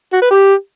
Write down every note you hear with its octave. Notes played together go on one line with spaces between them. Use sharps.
F#4
B4
G4